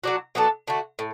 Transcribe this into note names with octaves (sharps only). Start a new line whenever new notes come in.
F#3 D4 F#4
F#3 B3 D4 A4
D3 A3 F#4
A2